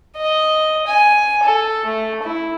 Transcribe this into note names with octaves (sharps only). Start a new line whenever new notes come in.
D#5
G#5
A4
A3
E4